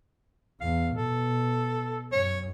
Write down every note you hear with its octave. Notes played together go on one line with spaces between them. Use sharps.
E2 F5
B2 A4
F#2 C#5